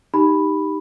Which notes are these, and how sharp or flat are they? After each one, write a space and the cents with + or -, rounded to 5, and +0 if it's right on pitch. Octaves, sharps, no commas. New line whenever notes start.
D#4 +0 G4 +0 B5 +0